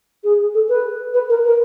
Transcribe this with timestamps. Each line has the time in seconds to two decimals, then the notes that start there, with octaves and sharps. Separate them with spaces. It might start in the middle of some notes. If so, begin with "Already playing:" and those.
0.24 G#4
0.54 A4
0.69 B4
1.14 B4
1.29 A#4
1.45 A#4